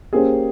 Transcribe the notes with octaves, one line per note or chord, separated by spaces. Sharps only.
A#3 C#4 G4 G#4 C5